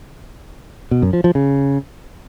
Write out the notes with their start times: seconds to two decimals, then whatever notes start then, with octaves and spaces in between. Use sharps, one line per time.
0.91 B2
1.02 F#2
1.13 F3
1.24 F3
1.35 C#3